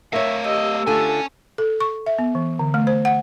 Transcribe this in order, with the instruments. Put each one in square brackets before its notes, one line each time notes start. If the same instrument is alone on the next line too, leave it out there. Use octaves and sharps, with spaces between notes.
[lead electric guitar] A3 F5 [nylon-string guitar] A#4 C#5 [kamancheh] E5
[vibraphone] G4 E6 [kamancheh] D#5
[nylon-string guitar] D3 A3 F4 [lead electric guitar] C#4 G#5 [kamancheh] A4
[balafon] A4
C#6
E5
B3
E3
D3
A3
C5
F#5